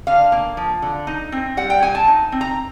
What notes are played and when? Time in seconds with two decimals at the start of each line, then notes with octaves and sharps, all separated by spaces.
0.07 D3 F5
0.32 A#3
0.57 F3
0.82 D3
1.07 D#4
1.32 C4
1.57 G3 F#5
1.70 G5
1.82 A#2 G#5
1.95 A5
2.07 D#4
2.32 C4
2.41 A#5